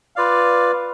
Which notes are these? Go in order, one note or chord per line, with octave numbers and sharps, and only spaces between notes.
F4 B4 D5 F5